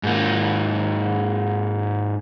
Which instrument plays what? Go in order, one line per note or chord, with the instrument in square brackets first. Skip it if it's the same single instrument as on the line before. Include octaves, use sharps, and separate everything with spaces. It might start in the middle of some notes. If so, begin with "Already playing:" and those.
[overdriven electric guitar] G#2 A#3